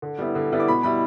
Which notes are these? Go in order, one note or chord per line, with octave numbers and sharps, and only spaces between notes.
D3
G3 B3 E4
D3
G3 B3 E4
D6
B2 B5
G3 E4 B5